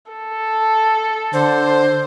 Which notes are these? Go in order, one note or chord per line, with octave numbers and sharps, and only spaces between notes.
A4
D3 C5